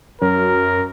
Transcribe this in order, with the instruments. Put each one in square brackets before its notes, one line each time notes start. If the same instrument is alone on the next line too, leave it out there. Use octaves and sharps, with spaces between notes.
[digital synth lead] F#2 [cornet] A#4